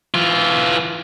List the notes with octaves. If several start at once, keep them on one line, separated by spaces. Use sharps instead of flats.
E3 F4